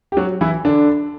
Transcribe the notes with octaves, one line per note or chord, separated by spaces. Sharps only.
G4
F#3 F#4
E3 E4
D3 D4